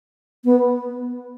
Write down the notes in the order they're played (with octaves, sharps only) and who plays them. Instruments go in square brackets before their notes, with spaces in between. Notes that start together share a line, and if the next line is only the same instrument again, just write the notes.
[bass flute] B3